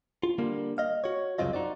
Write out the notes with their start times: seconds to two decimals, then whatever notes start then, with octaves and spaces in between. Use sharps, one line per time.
0.23 F4
0.38 D3 G3 A#3
0.78 D#5 F5
1.04 F#4 C#5
1.38 C2 F#2 C#3 C4 F4 D#5
1.53 D#4 F#4 D5